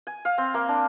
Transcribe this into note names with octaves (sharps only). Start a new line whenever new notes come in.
G#5
F5
C4
A#3
D4